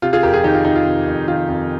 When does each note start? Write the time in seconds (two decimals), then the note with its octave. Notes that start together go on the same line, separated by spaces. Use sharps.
0.02 C3 F4
0.13 F4 G#4
0.23 F2 G4 A#4
0.33 F4 G#4
0.44 D#3 D#4 G4
0.55 F4
0.65 F2 D#4
0.75 F4
0.86 C3
1.07 F2
1.28 D#3 F4
1.49 F2